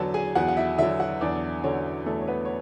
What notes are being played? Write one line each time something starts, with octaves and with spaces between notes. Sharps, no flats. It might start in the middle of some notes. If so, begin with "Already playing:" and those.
Already playing: E2 D3 F#3 A4 B4 A5
G#4 G#5
E2 F#4 F#5
F#5
E4 E5
D3 F#3 E4 E5
F#4 F#5
E2 D4 D5
D3 F#3 C#4 C#5
E2 A3 A4
C#5
B3 B4
C#5